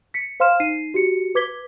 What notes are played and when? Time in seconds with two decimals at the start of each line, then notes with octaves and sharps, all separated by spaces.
0.14 B6 C#7
0.40 C5 F5 C6 F6 E7
0.60 D#4 C7 D#7
0.94 F#4 G4 C#7
1.35 B4 D6 G#6 B6 G7